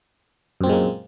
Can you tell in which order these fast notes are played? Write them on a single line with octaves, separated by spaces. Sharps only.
F#2 C4 A#2 G#3 A#3